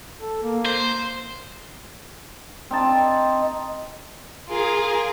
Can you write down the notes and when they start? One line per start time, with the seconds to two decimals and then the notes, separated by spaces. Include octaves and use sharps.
0.20 A4
0.43 A#3
0.65 C5
2.71 C4 D#4 A5
4.48 F4 G#4 A#4